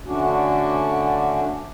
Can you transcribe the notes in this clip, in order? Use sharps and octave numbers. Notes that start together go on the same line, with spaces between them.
D3 A3 C#4 D4 F#4